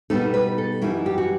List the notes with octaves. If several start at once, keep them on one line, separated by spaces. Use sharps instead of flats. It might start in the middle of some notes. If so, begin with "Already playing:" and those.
B2 G3 B3 D#4 A4
B4
A4
F#2 E3 G3 D#4 E4
G4
F#4